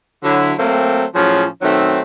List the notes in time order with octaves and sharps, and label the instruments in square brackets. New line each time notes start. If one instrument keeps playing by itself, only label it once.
[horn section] D3 F#3 E4
F#3 A3 A#3 C4
A2 F3 F#3 C#4 F4 G#4
B2 D#3 F#3 A3 C4